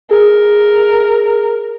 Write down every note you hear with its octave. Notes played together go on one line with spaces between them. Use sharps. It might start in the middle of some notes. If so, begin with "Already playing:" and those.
G#4 A#4